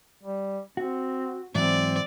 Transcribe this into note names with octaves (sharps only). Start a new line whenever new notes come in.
G3
C4 F#4
G#2 E3 F#3 C4 D5